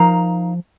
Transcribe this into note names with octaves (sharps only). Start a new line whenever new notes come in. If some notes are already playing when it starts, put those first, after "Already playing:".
Already playing: F3 D#4 A#4 F5 A#5